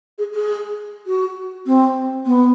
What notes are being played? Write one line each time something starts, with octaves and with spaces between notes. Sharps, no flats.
G#4
G#4
F#4
C4
B3